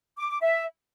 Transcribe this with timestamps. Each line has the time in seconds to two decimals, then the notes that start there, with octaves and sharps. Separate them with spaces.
0.17 D6
0.29 D6
0.41 E5